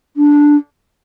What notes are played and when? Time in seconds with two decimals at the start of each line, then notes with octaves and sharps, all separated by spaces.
0.17 D4